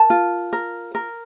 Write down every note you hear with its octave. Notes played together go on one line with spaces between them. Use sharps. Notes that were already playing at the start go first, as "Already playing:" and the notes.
Already playing: A#4 A5
F4
A#4
A#4